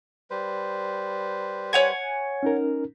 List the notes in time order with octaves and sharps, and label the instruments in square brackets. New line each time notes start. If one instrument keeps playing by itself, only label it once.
[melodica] G3 B4 C5
[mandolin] C#5 F#5 G#5
[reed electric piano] C#4 D#4 A#4